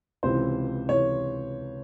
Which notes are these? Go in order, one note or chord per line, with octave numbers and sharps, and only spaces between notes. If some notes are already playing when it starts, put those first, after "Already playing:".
C#2 C3 E3 C5
C3 E3 C#5